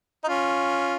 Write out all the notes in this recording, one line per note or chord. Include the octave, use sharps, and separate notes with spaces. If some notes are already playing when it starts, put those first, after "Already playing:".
D#4
C#4 F4